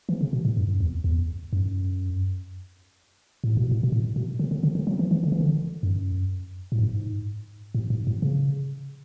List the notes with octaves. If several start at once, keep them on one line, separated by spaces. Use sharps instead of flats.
E3
C#3
B2
A2
F#2
E2
E2
F#2
A2
B2
A2
B2
A2
B2
D3
D3
D3
D3
F#3
E3
E3
D3
E3
D3
F#2
A2
G#2
A2
G#2
A2
C#3